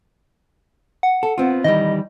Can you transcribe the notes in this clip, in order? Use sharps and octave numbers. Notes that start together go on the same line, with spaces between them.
F#5
A4
B3 C4 F4
D#3 E3 G3 D#5